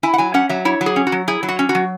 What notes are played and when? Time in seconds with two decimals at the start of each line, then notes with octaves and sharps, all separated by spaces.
0.03 E4 G#5
0.14 F#5
0.18 F#3 G#5
0.34 C#4 F#5
0.49 F#3 E5
0.65 E4 C#5
0.81 F#3
0.86 G#4
0.96 C#4
1.07 F#4
1.12 F#3
1.28 E4 G#4
1.43 F#3
1.48 F#4
1.59 C#4
1.69 F#4
1.75 F#3